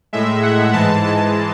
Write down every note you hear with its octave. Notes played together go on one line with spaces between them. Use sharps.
A2 G#3 E5
F#5
G#2 E3 G#3 A5
A5